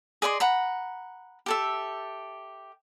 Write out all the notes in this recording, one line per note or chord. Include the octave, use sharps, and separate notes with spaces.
G#4 D5 D#5 C6
F#5 A#5 B5
G4 A4 E5